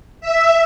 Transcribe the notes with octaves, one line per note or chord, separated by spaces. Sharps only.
E5